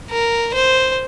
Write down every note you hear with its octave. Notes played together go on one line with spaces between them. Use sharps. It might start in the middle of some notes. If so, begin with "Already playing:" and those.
A#4
C5